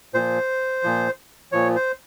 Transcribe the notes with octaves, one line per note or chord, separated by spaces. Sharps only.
A#2 F3 C5
A#2 F3
A#2 F3 C#5
C5